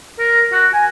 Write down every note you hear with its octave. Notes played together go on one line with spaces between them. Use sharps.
A#4
F#4
G#5